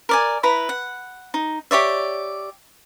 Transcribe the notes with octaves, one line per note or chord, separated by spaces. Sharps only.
A#4 D5 G#5
E4 B4 A#5
F#5
D#4
G4 C#5 D5 E5